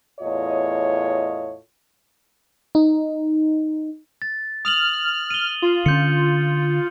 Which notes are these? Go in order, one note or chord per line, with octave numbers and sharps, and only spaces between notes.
E2 A2 F4 C#5 D#5
D#4
A6
D#6 F6 F7 F#7
D#7 G7
F4
D3 C#4 G6 C#7